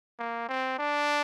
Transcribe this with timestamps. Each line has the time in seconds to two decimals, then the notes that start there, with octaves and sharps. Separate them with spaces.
0.19 A#3
0.49 C4
0.79 D4